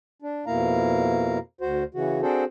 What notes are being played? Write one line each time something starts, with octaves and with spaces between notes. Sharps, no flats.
D4
F2 B2 A#3 E4 F5 A#5
D2 F#4 C5
C#3 E3 F#4
C4 D4 F#4 G#4 A4 C5